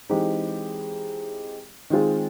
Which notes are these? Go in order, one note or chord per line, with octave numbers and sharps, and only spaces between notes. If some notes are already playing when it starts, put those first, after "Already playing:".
E3 G#3 C4 D#4 G4
D#3 G#3 C4 F4 G#4